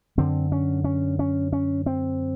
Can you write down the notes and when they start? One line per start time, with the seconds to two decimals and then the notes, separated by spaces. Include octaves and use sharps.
0.18 F#2 D3 C4
0.52 C#4
0.84 C#4
1.19 C#4
1.53 C#4
1.86 C4